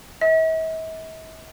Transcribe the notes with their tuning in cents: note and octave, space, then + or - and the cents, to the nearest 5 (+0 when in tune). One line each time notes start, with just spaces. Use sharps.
E5 -45